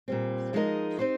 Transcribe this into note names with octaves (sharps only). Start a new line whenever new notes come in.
A#2 G3 C4
F3 G#3 D#4 A#4 D#5
C4 D#4 G4 C5